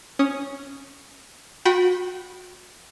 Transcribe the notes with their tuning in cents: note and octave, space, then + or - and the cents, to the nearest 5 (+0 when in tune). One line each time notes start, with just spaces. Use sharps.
C#4 +0 D#6 +0
F#4 -35 G5 -25 B5 +0